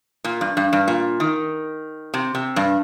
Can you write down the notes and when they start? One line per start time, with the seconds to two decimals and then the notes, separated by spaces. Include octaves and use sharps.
0.24 A#2
0.41 G2
0.57 G2
0.73 G2
0.88 A#2
1.20 D#3
2.14 C3
2.35 C3
2.56 G2